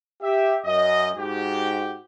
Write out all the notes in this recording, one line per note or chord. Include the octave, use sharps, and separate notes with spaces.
G4 E5
F#2 D#5
G#2 F#4 G4